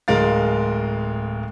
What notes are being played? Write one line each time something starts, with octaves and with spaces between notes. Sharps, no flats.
D1 G#3 A#4 F5 A6